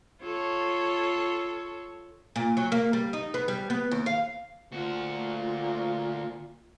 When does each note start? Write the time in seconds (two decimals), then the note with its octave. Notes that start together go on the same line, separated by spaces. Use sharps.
0.22 F4 A4 C#5
2.36 A#2
2.57 F#3
2.72 A#3
2.93 G3
3.13 D#4
3.34 B3
3.48 G3
3.70 B3
3.91 D#2
4.06 F5
4.72 D2 A#2 F4 F#4